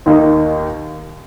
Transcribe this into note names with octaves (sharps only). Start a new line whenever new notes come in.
D#2 D#3 A#3 D#4